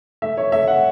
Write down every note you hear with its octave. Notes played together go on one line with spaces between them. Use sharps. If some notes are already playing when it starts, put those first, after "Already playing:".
A3 E5
C#5
A3 E5
F#5